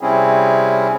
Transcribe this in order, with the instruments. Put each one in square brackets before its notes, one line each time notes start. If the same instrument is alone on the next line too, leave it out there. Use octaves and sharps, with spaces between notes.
[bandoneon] C3 G3 C4 C#4 E4 G#4